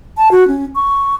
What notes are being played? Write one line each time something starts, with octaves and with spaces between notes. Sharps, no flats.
A5
F#4
C#4
C#6